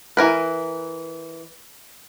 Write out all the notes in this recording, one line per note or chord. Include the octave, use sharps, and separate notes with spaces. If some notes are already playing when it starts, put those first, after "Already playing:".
E3 A#4 B4